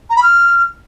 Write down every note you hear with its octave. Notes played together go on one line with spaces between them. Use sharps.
A#5
B5
F6